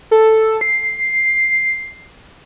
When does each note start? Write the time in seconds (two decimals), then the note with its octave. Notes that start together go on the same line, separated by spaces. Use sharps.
0.11 A4
0.61 C7